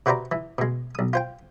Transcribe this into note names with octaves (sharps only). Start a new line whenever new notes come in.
C3 F#4 B4 C5 D5 A#5
E3
B2 G#3
B1 D#6
F4 C5 G5